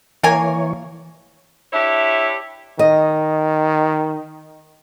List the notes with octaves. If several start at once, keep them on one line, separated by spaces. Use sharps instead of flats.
E3 A#3 A#4 C#5 G#5
D4 E4 G4 C#5 E5
D#3 D#5